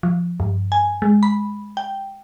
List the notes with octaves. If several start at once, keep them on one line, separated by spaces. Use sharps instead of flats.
F3
G2
G#5
G#3
B5
G5